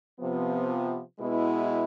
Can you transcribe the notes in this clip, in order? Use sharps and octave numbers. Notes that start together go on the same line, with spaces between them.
C3 F3 B3
B2 G#3 B3 E4